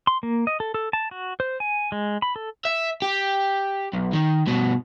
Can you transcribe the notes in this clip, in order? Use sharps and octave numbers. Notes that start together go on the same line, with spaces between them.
C6
A#3
D#5
A4
A4
A5
F#4
C5
G#5
G#3
B5
A4
E5
G4
B1
D#3
G2 B2